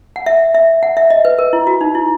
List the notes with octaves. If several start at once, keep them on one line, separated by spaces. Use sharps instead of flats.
F#5
E5
E5
F#5
E5
D#5
B4
A#4
E4
F#4
D#4
E4